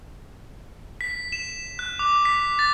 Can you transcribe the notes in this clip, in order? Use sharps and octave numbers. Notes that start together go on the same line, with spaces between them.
B6
E7
F#6
D6
B6
A6